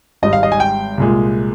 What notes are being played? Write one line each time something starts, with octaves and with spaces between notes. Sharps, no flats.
G#1 G#2 G3 D#5
F5
D#5
G#5
G5
C2 A#2 G#3